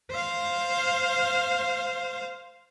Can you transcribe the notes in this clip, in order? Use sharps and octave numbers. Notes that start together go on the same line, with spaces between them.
C5 F5